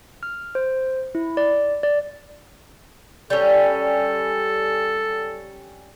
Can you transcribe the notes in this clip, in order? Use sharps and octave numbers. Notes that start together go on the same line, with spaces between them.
F6
C5
E4
D5
D5
G3 C#4 A4